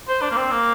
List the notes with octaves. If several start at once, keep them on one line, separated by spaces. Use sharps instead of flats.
C5
D4
A#3
C4
A#3